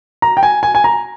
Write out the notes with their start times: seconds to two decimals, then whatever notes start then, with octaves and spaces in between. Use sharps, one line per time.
0.22 A#5
0.37 G5
0.43 G#5
0.63 G#5
0.75 G#5
0.84 A#5